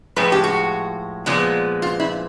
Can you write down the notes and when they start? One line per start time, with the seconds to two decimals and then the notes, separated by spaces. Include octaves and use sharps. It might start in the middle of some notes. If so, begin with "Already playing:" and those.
0.16 A2 F3 G#3 B4
0.32 G4
0.44 F#4
1.26 A#2 F3 G#3 B3
1.82 F4
2.00 E4